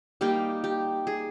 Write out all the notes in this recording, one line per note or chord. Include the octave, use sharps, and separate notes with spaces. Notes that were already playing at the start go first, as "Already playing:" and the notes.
G3 A#3 D#4 G4
G4
G#4